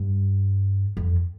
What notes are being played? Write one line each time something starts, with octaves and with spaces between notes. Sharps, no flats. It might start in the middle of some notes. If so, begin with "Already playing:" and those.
Already playing: G2
F2